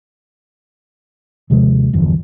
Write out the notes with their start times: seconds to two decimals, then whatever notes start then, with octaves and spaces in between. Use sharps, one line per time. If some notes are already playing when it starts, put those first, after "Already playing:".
1.50 D#2 C3 F3 G#3
1.93 G1 E2 F3